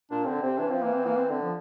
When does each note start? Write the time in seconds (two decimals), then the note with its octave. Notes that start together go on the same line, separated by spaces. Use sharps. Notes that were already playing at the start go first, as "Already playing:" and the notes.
0.11 A#2 D4
0.26 D3 C4
0.43 C3 C4
0.58 E3 D4
0.70 F3 C4
0.82 E3 A#3
0.94 C4
1.06 E3 A#3
1.17 C4
1.29 D3 C4
1.41 F3